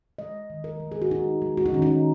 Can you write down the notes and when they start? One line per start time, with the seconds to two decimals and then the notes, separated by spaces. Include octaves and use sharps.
0.19 G#3 D#5
0.50 D#3
0.64 A#4
0.80 G#3
0.92 G#4
1.02 F#4
1.10 G#3 D#4
1.42 G#3
1.57 F#4
1.66 D#4
1.72 D#3 C#4
1.82 D#4